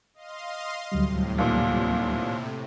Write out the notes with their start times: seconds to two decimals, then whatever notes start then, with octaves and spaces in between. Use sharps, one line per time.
0.14 D#5 F5 C6
0.92 D2 A2 C3 F#3 G3
1.38 D#2 A#2